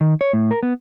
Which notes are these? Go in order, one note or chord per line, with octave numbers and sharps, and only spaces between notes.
D#3
C#5
A2
A#4
B3